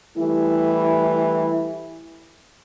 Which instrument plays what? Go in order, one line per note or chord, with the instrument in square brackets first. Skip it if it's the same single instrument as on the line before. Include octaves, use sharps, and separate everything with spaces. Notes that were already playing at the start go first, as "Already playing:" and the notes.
[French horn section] E3 G3 A3 E4